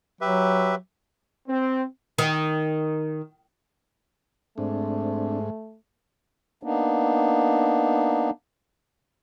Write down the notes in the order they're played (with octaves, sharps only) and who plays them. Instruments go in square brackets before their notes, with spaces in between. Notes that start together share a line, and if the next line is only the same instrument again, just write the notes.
[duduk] F#3 [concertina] G4 B4 E5
[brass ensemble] C4
[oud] D#3
[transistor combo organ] G#2 [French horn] A3 [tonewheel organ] C4 D4
[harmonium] A#3 B3 D4 D#4